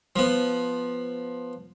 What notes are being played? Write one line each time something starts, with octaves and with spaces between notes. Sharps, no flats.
F3 B3